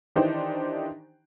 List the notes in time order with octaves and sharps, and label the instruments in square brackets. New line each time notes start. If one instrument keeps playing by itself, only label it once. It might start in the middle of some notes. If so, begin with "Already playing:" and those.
[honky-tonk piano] D#3 E3 D4 D#4 G4 C5